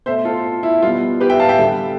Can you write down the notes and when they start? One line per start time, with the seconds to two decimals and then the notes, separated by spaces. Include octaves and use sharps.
0.06 B2 A3 C5 E5
0.25 F4 A4
0.63 E4
0.82 B2 G3 B3 F4
1.21 G4 B4
1.30 E5 G5
1.40 F5 A5
1.49 E5 G5
1.59 D3 G3 B3